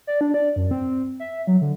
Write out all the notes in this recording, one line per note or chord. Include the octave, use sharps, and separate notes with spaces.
D5
D4
D5
F#2
C4
E5
F#3
D3